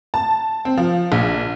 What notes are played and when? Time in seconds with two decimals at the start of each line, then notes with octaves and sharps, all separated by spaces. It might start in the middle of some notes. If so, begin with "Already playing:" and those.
0.14 A5
0.65 C4
0.77 F3
1.12 A#1